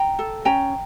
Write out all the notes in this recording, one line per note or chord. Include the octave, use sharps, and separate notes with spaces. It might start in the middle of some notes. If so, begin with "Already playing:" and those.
Already playing: G5 A#5
A4
C#4 G5 A#5